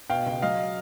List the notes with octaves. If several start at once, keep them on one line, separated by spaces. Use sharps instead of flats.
B2 F5 G5
C#2
F#3 D#5 F5